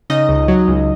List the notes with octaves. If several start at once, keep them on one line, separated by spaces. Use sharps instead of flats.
C#3 D#4 D#5
C#2
F#3
C#2